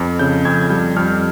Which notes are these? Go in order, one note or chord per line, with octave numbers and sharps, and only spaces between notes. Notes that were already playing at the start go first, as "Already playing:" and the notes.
Already playing: F2
C#3 G6
F2 G#6
G#6
G3 G6
F2 F6